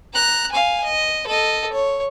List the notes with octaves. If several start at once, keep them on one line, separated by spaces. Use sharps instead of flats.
A#5 F#6
F5 G#5
D#5
A4 D#5
C#5